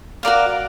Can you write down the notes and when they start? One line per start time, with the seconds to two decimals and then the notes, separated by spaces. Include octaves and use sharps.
0.23 F#4 A#4 D5 F5